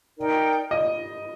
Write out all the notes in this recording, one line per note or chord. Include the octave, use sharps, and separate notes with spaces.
D#4 A#4 D5 G5
D#5